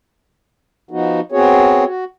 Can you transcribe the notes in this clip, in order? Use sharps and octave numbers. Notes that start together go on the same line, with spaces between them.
F3 B3 D#4 F#4
B3 C4 F#4 G#4 C#5
F#4